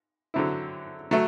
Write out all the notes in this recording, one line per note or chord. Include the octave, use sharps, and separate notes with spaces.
D3 F#3 C4 E4
F#3 A3